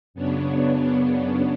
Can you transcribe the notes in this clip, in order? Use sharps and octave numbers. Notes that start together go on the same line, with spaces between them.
F#2 C#3 B3 C#4 D4